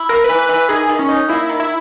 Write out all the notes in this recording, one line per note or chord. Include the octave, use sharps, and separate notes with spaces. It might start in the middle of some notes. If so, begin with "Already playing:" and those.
Already playing: E4
A#3 A#4
E3 B4
B4
E3 B4
D#3 G#4
D#3
C#4
D#4
A#3 E4
D#3
E4